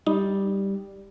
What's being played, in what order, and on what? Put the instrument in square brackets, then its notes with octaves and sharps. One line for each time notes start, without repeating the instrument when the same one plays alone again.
[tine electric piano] G3 [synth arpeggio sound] D#4